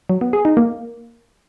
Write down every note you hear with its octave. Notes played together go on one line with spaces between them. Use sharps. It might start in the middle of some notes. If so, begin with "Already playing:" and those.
F#3
B3
G#4
D#4
A#3